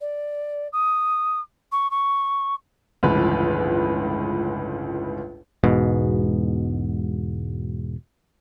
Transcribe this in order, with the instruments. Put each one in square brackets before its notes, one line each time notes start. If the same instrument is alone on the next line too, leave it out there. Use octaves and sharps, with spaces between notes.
[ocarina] D5
D#6
C#6
C#6
[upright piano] G1 C#2 A2 E3 F3 B4
[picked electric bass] E1 G#2 B2